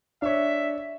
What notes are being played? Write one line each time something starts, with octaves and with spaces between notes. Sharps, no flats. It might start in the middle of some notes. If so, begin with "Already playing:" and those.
D4 C#5 E5